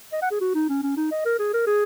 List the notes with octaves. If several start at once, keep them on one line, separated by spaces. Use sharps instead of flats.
D#5
F#5
G#4
F#4
D#4
C#4
C#4
D#4
D#5
A#4
G#4
A#4
G#4